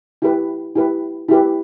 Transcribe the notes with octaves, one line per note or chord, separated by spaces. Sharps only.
E4 G4 B4
E4 G4 B4
E4 G4 B4